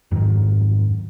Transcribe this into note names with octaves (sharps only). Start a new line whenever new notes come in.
F2 G#2 D#3 F#3